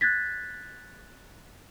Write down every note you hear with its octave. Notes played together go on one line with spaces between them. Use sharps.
F#6 G#6 A6 B6